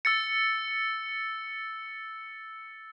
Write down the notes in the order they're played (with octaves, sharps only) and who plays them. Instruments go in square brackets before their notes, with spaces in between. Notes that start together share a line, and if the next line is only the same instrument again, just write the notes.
[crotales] E6 A6 C#7